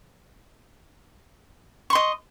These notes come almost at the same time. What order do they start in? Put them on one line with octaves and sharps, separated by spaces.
C#6 C6 D#5